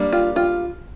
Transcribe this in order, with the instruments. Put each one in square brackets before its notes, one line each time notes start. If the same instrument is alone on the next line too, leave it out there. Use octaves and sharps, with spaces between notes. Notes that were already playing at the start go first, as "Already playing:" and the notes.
Already playing: [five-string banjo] G3 A#3 D4
F4
F4